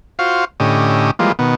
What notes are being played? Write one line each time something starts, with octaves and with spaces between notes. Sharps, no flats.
F4 F#4 C5 F5
A2 D3 C#4 G4 D#5
E3 F3 G3 G#3 A#3 F4
B2 D#3 B3